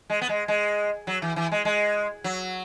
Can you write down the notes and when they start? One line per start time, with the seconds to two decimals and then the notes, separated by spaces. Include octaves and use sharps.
0.10 G#3
0.21 B3
0.29 G#3
0.48 G#3
1.07 F#3
1.22 E3
1.36 E3
1.52 G#3
1.65 G#3
2.24 F#3